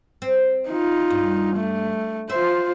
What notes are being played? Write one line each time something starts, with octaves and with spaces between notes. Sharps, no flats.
C4
D#4 F4
G2
A3
F4 C5 E5